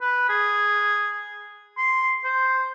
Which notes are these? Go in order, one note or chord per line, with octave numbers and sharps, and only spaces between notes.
B4
G#4
C6
C5